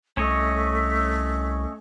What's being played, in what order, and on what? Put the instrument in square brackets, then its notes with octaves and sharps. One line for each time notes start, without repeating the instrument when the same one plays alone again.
[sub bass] C2 [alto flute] A3 [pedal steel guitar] C#4 C#5 D#5